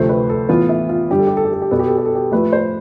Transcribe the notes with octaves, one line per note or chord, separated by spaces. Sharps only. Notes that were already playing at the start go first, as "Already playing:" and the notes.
Already playing: D2 C3 F3 A3 C4 C5
B4
A4
A2 E3 B3 F4
E4
F4
G2 D3 G3 G4
A4
G4
A4
G4
A4
G4
B2 B3 A4
G4
A4
G4
A4
G4
A2 F3 A3 B4
C5